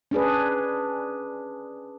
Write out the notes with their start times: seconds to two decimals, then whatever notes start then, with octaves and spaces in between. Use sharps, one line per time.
0.11 C#4 D4 G#4 B4